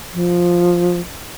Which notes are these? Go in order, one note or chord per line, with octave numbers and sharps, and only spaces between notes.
F3